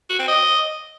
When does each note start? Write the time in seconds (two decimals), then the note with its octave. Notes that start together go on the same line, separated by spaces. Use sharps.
0.10 F#4
0.19 C4
0.28 D#5